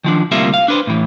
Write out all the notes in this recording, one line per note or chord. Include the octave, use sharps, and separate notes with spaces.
D#3 F3 D4
D2 C3 G3 A#3 F4 E5
F5
D4 B4 C5
A2 E3